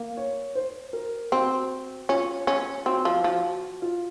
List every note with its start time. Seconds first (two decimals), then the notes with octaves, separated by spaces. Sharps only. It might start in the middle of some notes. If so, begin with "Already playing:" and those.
Already playing: A#3
0.17 C#5
0.55 C5
0.93 A#4
1.32 C4 F#4
2.09 C#4 F4
2.47 C#4 F4
2.86 C4 F#4
3.05 F3
3.24 F3 F#4
3.82 F4